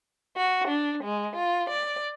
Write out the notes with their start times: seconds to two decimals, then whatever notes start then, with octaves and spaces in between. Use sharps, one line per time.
0.36 F#4
0.68 D4
1.05 G#3
1.36 F4
1.70 D5